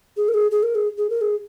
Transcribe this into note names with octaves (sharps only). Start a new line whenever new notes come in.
G#4
A#4
G#4
G#4
A#4
G#4
G#4
A#4
G#4